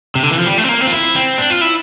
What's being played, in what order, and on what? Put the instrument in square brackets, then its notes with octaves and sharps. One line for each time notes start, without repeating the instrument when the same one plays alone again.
[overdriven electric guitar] C3
D3
E3
F3
G3
A3
C4
A#3
C4
F4
E4
C4
D4
F4
E4